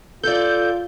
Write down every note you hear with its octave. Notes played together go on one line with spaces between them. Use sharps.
F4 A4 D5 G6